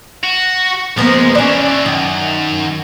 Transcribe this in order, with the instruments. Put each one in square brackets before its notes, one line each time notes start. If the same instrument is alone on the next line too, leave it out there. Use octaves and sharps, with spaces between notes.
[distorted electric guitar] F#4
[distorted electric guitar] C#2 G#3 [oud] F3 A#3 B3
[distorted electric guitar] E3 D4 [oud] C#4 D5
[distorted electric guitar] F#2 [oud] D#3